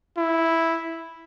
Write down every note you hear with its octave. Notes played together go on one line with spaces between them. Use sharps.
E4